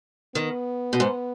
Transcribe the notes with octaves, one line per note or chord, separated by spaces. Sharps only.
D#3 B3
B2
G#2